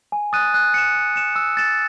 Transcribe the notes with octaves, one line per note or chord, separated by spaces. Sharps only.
G#5
D#6 F#6 A6 D#7
F#6
C#7 E7
F#6
C#7 E7
E6
A6 E7